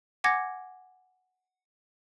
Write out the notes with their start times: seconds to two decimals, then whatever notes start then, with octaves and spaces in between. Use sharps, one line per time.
0.24 F#5 G#5 D6 G#6 A#6 C#7